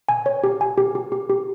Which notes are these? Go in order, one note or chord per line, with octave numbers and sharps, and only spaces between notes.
G#5
C#5
G4
G#5
G4
G4
G4
G4